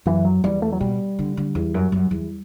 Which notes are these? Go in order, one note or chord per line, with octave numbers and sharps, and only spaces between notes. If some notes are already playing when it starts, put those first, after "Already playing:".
F#2 E3
F#3
E2 G3
A3
F#3
B2 G3
D3
D3
E2
F#2
F#2
E2